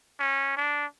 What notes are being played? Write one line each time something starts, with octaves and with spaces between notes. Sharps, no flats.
C#4
D4